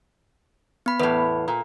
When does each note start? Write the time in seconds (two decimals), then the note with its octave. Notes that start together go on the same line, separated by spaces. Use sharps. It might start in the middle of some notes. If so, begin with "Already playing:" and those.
0.86 B3 B5
1.00 E2 A2 B4
1.48 A#2